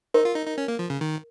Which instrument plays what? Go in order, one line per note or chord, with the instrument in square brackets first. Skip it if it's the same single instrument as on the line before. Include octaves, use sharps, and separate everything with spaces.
[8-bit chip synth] D#4 [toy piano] A#4
[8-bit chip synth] F4
D#4
D#4
C#4
A#3
F3
C#3
D#3